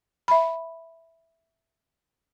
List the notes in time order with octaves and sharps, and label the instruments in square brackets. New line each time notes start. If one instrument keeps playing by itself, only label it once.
[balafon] E5 B5